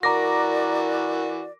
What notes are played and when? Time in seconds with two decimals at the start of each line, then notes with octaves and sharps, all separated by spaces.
0.03 E3 F#4 A#4 D5 A#5 D6 A#6